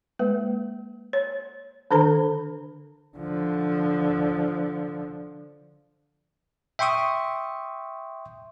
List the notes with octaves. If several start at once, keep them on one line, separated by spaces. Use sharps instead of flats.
G#3 A#3 B4
C#5
D3 D#3 D4 A4 C5 A#5
D3 F3
E5 G5 C6 C#6 D#6